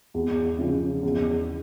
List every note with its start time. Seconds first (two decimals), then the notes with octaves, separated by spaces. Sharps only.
0.14 E2
0.59 C#3 F3
1.03 E2